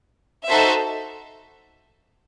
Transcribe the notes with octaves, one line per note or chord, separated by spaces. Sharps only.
D#4 F#4 A4 C5 E5